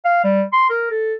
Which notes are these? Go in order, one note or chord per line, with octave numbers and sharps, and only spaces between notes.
F5
G3
C6
A#4
A4